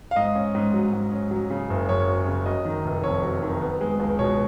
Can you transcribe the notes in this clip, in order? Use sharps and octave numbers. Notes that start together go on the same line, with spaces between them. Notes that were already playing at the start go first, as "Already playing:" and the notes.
F5
G#2 D#5
C#4
G#2
F#3
G#2
C#4
F#3
C#3
F#1
F#2 C#5
F#3
C#3
F#3 D#5
D#3
F1
F2 C#5
F#3
D#3
B3
G#3
C#2
B2 C#5